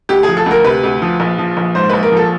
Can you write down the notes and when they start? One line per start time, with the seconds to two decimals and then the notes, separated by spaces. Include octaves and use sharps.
0.09 D2 G4
0.23 G#4
0.28 F3
0.37 A4
0.46 D2 A#4
0.65 C3 B4
0.83 D2
1.02 F3
1.20 A#1
1.38 F3
1.57 A#1
1.75 G#2 C5
1.90 A#1 B4
2.03 A#4
2.12 F3 A4